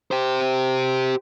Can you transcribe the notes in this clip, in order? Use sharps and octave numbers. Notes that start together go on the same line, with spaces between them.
G4 C5